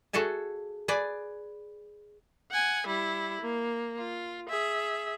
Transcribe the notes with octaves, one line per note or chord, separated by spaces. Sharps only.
F#4 G#4 A4 E5 G#5
G#4 B4 D5 G#5
F#5 G#5
G3 E4
A#3
F4
G#4 E5